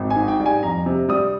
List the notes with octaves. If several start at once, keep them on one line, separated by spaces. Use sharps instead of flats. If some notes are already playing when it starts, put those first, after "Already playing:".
Already playing: G#1
G#5
G#2
G5
G3
G#5
F2 A#5
C3
G3 D#6